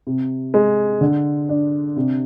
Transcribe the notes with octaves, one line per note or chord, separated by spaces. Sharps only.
C3
G#3
D3
D4
C3